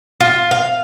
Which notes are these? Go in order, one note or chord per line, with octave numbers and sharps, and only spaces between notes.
F4
F5